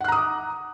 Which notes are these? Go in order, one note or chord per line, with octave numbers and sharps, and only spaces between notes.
F#5 A#5 D6 D#6 F#6